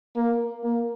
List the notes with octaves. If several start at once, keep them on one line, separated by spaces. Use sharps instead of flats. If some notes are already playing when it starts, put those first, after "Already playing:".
A#3
A#3